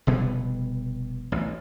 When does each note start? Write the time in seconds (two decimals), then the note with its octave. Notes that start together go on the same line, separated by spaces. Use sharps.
0.07 F1 B2 G3 B3
1.32 A1 D2